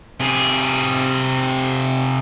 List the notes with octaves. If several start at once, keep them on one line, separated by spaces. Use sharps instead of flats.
C3 G#4